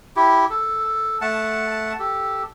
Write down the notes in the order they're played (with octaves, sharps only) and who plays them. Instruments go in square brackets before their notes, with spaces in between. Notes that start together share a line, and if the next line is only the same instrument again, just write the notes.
[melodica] E4 G4
A4
A3 F#5 A5
G4 A4